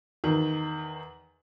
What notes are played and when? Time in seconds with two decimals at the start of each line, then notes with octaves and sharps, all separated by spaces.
0.24 E2 D#3